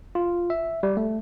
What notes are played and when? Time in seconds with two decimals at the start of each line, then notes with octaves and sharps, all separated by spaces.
0.15 F4
0.50 E5
0.83 G3
0.97 A3